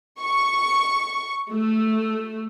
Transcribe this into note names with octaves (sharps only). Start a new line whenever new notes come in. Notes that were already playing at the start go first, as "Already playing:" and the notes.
C#6
A3